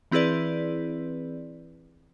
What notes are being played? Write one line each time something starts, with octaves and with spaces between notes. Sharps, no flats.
E3 C4 E4 G#4 B4 D5